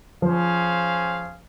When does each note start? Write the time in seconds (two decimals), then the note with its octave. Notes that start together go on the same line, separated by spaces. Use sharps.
0.22 F3 C#4 G#4 C5 F5